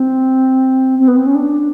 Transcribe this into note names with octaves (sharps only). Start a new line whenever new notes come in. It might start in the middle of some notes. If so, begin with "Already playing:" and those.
Already playing: C4
C4
B3
C4
C#4
D4